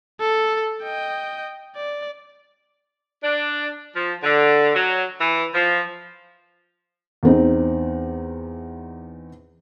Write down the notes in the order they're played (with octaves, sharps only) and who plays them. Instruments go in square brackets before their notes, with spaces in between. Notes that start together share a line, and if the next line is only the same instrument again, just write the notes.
[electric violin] A4
D#5 G5
D5
[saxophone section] D4
F3
D3
F#3
E3
F3
[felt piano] E2 C4 D#4